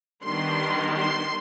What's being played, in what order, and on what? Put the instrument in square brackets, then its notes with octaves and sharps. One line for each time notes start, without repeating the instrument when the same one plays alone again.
[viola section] D#3 G3 B3 D4 C6
C6